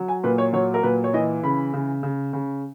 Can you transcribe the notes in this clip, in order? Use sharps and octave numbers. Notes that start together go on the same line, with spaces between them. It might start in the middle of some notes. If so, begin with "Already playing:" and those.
Already playing: F#3
G#5
A#2 B4
C#5
F#3 C#5
A#4
A#2 B4
C#5
E3 D#5
C#3 B5
C#3
C#3
C#3